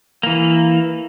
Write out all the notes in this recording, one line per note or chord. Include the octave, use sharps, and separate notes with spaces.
E3 A#3